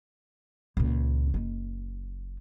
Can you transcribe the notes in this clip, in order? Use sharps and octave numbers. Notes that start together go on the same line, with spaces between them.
C#2 A#2
F#1 D#4